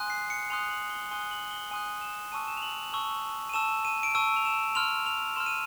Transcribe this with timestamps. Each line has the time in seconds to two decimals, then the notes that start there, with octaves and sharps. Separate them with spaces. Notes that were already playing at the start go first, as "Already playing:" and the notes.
Already playing: G#5 C6 D#6 F#6
0.10 C7
0.30 C#7
0.50 G#5 C6 D#6 F#6 F7
0.70 F#7
0.90 G7
1.11 G#5 C6 D#6 F#6 G7
1.31 F#7
1.51 G7
1.71 G#5 C6 D#6 F#6
2.01 E7
2.32 A5 C#6 E6 D#7
2.48 E7
2.57 F7
2.62 F#7
2.93 A5 C#6 E6
3.49 D#7
3.54 A5 C#6 E6 E7
3.85 D#7
4.03 D7
4.15 A5 C#6 E6 D#7
4.36 F7
4.45 E7
4.75 C6 F6 F7
5.06 F7
5.36 C6 F6 E7
5.46 D#7